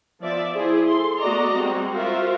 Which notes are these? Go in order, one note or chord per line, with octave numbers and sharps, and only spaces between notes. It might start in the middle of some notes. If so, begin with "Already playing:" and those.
F3 B3 D5 E5
E4 G#4 C5
A4 C6
A3 B3 F#4 D5 D#5 A#5
G3 G#3 C4 F#4
F4 F#4 A#4 C5 E5 F5